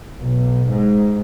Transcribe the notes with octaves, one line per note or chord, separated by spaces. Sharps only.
B1
G#2